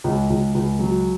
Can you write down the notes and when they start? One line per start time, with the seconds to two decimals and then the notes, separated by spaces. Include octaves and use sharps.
0.04 C#2
0.30 C#2
0.55 C#2
0.79 F#3